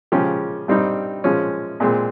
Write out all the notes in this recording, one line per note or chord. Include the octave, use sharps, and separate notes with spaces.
C#3 F3 G#3 C#4 G4
G2 G3 C4 D#4
F3 G#3 C#4
A#2 G#3 C4